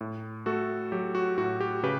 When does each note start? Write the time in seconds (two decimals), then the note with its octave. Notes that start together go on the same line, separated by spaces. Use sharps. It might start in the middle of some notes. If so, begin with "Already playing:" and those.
0.01 A2
0.46 A3 F#4 A4
0.92 F#3 G4
1.15 F#4
1.38 A2 F#4
1.60 G4
1.83 C#3 G4 B4